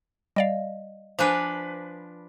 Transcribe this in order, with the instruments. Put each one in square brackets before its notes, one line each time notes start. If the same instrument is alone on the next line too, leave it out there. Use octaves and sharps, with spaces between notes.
[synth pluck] G3 D5 F5 [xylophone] D#5
[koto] F3 D4 B4 [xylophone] C5 G#5 D6